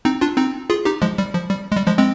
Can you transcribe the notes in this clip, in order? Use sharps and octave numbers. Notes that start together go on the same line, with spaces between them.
C4 D#4
D4 F4
C4 D#4
F4 G#4
D#4 G4
F3 G#3
G3
F3
G3
G#3
G3
F3 G#3
G#3 C4